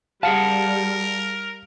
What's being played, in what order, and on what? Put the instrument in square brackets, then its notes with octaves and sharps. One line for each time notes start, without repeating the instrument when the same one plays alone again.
[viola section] G3 [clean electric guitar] G#4 F#5 A5 [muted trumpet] A#4 [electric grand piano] F5